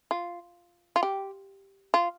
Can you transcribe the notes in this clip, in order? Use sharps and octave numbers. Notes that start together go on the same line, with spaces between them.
F4
F4
G4
F4